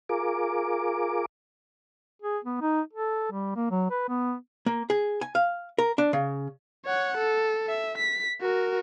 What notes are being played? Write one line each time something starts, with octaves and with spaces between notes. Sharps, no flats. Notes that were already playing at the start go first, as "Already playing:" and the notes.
F4 G#4 A#4 D6
G#4
B3
D#4
A4
G3
A#3
F#3
B4
B3
A#3
G#4
G#5
F5
A#4
D4
C#3
C#5 F#5
A4
E5
B6
F#4 A#4